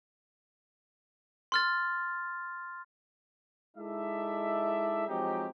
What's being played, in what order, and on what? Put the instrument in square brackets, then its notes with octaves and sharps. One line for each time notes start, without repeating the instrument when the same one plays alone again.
[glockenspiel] C6 F6 A6
[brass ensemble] G#3 D#4 E4 A4 D5 E5
F3 F#3 G#3 C4 D#4 G4